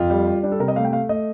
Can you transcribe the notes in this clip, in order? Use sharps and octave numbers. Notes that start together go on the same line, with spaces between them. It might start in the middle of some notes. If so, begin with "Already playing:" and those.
Already playing: F2 F4
G3
G3
G3 D4
A4
C3 A#4
D#5
A3 F5
G5
A3 F5
A3 D#5